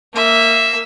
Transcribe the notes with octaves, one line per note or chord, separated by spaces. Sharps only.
A#3 E5